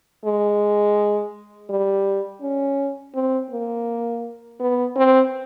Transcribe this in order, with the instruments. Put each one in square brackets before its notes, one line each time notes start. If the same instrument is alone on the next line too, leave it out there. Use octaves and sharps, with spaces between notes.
[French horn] G#3
G3
C#4
C4
A#3
B3
C4